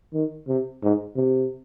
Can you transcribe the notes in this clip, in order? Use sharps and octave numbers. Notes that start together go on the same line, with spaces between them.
D#3
C3
G#2
C3